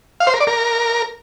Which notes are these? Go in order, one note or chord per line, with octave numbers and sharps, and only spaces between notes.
F5
C5
A#4
D5
A#4